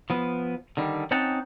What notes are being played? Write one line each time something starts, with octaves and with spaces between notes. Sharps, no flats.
F3 B3
D3 D#3 G3
C4 C#4 D#4 F#5 G5 A5